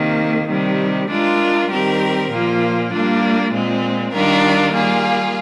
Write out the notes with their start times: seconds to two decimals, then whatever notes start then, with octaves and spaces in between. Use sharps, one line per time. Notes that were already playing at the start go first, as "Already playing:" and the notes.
Already playing: C3 D#3 A#3
0.48 C3 D#3 G3
1.08 G#3 D4 F4 A#4
1.69 D#3 G3 C4 G4 A#4
2.30 A#2 F3 A#3 F4
2.90 G3 A#3 D4 F4
3.52 A#2 G#3 C4
4.13 D#3 G3 D4 F4 A#4
4.74 G3 A#3 F4 G#4